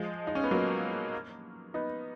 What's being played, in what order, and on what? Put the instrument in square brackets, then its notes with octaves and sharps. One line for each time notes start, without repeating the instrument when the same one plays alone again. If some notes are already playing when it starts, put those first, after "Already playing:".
Already playing: [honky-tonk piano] F3 G#3
D#4
C#4
B3
F#3 A#3
B3 D#4